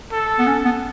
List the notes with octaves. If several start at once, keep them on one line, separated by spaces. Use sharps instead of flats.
A4
B3
C#4
B3